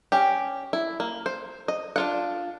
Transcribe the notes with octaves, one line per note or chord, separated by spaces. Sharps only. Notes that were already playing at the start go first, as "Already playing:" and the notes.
C#4 G4
E4
A#3
C5
D#5
D4 F4 F#5